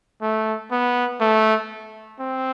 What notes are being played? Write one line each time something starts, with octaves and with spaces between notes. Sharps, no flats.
A3
B3
A3
C4